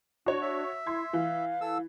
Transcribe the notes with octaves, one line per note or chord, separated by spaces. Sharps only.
D4 F#4 C#5
E5
E4 C6 G#6
E3 F5
A4 E6